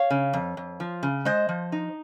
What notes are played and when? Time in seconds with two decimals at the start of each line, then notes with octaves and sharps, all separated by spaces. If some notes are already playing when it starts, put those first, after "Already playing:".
Already playing: C#5 F5
0.10 C#3
0.33 F2
0.57 F2
0.80 F3
1.03 C#3
1.25 G#3 C5 D#5
1.49 F3
1.72 D#4